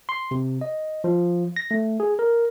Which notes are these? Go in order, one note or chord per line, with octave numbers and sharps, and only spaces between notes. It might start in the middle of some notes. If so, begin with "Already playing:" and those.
C6
C3
D#5
F3
A#6
A3
G#4
A#4